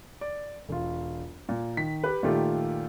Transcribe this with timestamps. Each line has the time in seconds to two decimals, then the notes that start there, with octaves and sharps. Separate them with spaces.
0.21 D5
0.69 E1 F4
1.49 A#2
1.77 D#3 B6
2.04 G4 B4
2.23 A#2 D#3 A3 F4 G4